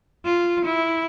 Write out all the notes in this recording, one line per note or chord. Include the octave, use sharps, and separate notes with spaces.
F4
E4